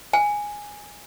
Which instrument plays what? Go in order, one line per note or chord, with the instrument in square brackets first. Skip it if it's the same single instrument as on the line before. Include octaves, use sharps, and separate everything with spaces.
[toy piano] G#5